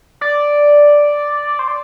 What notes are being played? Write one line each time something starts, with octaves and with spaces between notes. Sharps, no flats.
D5
C5
D5